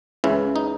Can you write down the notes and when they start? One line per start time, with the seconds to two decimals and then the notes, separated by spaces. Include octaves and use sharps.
0.24 C#2 C#3 E3 E4
0.56 D#4